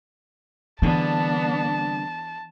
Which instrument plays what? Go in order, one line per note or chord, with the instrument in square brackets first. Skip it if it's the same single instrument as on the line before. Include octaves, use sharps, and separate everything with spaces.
[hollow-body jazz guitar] C2 D3 G#4 [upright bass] E3 [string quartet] B3 D4 [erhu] A5